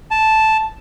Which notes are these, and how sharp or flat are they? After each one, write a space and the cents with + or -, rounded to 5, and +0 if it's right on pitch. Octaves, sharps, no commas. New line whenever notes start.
A5 -5